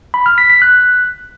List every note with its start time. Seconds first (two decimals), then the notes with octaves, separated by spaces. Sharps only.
0.14 B5
0.26 F6
0.38 B6
0.50 B6
0.62 F#6